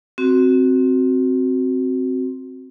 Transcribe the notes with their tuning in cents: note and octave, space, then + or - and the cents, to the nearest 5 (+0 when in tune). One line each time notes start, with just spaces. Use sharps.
C4 +0 F#4 +0